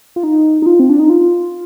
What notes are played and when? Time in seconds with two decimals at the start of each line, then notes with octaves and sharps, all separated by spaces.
0.16 F4
0.23 D#4
0.62 D#4
0.66 F4
0.80 C4
0.90 D4
0.99 D#4
1.10 F4